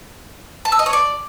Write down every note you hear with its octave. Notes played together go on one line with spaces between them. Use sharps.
A5
E6
D#5
C#5
D5